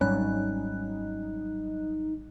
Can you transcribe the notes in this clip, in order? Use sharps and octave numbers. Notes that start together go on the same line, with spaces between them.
G#1 F#3 G3 C#4 D#4 F#6